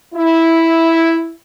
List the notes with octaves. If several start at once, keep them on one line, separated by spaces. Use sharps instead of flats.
E4